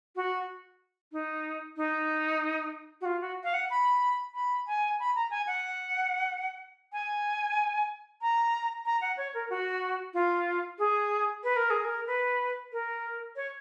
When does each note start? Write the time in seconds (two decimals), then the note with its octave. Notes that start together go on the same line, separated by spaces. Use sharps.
0.16 F#4
1.12 D#4
1.77 D#4
3.01 F#4
3.05 F4
3.21 F#4
3.44 F5
3.54 F#5
3.70 B5
4.34 B5
4.67 G#5
5.00 B5
5.16 A#5
5.31 G#5
5.47 F#5
6.93 G#5
8.22 A#5
8.86 A#5
9.01 F#5
9.17 C#5
9.34 A#4
9.50 F#4
10.14 F4
10.79 G#4
11.43 B4
11.56 A#4
11.70 G#4
11.84 A#4
12.07 B4
12.72 A#4
13.36 C#5